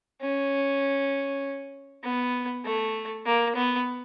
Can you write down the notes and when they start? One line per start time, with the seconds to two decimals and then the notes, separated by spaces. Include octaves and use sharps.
0.21 C#4
2.04 B3
2.65 A3
3.26 A#3
3.56 B3